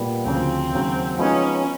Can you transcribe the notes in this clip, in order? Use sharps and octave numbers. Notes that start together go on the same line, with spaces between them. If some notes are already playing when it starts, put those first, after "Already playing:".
Already playing: A#2 G3 B3
D2 C#3 F3 C4
D#2 C#3 F#3
F3 G#3 B3 C#4 D#4 G#4